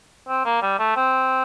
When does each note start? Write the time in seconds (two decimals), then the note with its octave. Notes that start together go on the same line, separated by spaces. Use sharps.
0.28 C4
0.45 A#3
0.62 G3
0.79 A3
0.96 C4